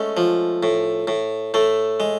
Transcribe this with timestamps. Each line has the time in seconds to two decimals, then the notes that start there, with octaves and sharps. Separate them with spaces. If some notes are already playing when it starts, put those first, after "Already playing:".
Already playing: G#3 A3 C#4
0.17 F3
0.63 A2
1.08 A2
1.54 A2 A3
2.00 G#3